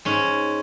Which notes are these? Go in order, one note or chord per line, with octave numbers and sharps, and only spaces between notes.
G#2 C#4